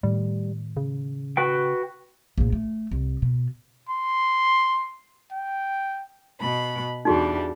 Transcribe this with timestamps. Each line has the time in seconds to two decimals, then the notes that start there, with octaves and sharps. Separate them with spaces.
0.03 A2 D#3 G3
0.77 C#3
1.37 F#4 B4 G5
2.38 A#1 A2
2.52 A3
2.91 C2
3.22 B2
3.89 C6
5.31 G5
6.40 B2 B5
7.05 E2 G3 D4 D#4 F#4 G#4